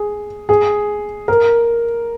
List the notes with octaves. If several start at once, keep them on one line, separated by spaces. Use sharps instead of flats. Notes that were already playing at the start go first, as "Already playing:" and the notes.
Already playing: G#4
G#4
A#4